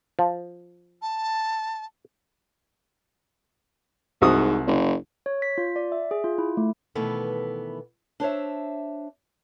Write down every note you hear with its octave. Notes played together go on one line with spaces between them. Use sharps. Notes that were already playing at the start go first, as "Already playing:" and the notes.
F3
A5
C2 G#2 F#4 D#6
F#1
C#5
B6
F4
D5
E5
G#4
F4
E4
A3
B2 D#3 E3 A3 B3 B4
D4 C5 C#5 E5